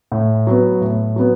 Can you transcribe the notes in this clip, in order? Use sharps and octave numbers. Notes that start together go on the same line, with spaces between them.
A2
F#3 B3
A2
F#3 B3